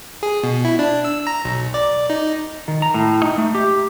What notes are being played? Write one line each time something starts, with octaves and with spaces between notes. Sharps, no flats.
G#4
B2
E4
D4
E6
A#5
B1
D5
D#4
D#3
A#5
A2
D#4
A3
G4